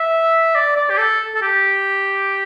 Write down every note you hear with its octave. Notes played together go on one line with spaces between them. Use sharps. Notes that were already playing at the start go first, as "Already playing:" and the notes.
Already playing: E5
D5
D5
G4
A4
A4
G4